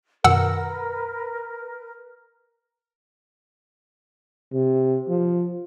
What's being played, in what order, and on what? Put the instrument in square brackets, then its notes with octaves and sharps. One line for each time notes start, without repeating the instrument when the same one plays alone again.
[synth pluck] F#2 B2 D#3 [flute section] A#4 B4 [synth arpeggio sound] F#5 E6
[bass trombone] C3
F3